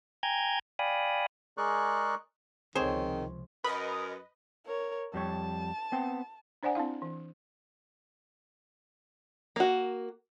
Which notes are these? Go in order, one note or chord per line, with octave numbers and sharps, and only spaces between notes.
G5 G#5 A#5 G6 G#6
D5 F5 G5 G#5 B5 D#6
G#3 G#4 A#4 D5 C#6 F#6
C#2 C3 D#3 F3 C4 G#4 C5 C#5
F#2 A#4 B4 D#5 B5 D#6
A#4 C#5
F2 G3 C#5 A5
B3 C4 G5
D4 C5 D5 F#5 G#5
C4 D4 E4 F5
E3
A#3 F#4